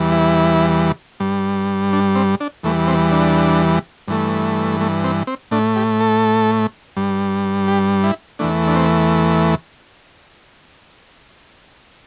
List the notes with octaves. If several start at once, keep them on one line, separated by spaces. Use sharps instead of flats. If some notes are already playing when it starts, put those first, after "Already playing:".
Already playing: E2 E3 G3
E4
G2 G3
D4
C4
D4
E2 E3 G3 A3
C4
D4
G2 E3 A3
A3
C4
C4
A2 A3 D4
G4
A4
G2 G3
G4
E4
E2 E3 A3 D4
D4
C4